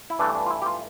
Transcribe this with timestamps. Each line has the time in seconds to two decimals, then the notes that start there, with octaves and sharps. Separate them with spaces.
0.10 E4
0.19 G2 E3 A3 D4
0.35 D4
0.46 F4
0.50 E4
0.62 G4
0.66 F4